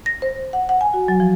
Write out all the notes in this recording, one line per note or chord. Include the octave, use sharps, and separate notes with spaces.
A#6
C5
F#5
F#5
G#5
F#4
F#3
F3